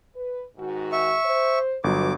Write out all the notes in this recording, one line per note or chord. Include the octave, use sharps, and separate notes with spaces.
B4
G#2 D#3 F#4
E5 C#6
C5
G1 B2 F#3 D6